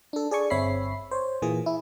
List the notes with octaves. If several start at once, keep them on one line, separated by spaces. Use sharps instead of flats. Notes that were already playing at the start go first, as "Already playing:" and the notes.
D4 A4
G#4 D5 G#5 C#6
G1 C4 C#5 E5 B5 C7
C5 C#5
A#2 E3 A#3 G#4
E4